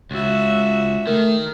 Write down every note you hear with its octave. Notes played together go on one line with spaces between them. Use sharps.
C#2 F#4 E5
D#3 A3 A#4